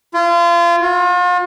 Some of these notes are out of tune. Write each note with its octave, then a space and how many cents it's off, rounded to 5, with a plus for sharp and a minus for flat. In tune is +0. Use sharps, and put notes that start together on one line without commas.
F4 -30
F4 +40